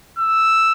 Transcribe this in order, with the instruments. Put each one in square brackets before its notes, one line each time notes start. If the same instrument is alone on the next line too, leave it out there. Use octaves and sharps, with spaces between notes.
[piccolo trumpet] E6